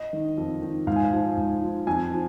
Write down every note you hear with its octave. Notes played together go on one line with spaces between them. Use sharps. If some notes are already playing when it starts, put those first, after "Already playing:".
Already playing: D#5
D#3
F2
D#3
G#2 F5
G#5
F5
F3
G#2
F3
F2 G#5
F3